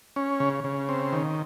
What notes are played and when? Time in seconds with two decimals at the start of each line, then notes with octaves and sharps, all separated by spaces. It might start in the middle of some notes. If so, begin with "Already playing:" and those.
0.16 C#4
0.40 C#3
0.64 C#3
0.89 C4
1.13 D#3